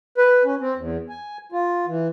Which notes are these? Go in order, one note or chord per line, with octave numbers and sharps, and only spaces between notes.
B4
C#4
C4
E2
G#5
F4
E3